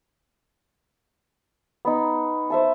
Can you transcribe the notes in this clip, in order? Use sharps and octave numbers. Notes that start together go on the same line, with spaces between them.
B3 D#4
C5 E5 A5